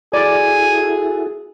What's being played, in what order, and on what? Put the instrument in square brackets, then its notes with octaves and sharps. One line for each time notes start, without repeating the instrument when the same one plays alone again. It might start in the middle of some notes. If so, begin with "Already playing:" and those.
[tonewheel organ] E4 F#4 A4 [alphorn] G#4 [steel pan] D5 [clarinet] G#5